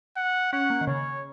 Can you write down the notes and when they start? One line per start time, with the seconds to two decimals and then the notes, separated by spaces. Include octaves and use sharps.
0.17 F#5
0.53 C#4 F#5
0.70 A#3
0.81 D#3
0.87 C#3 C#5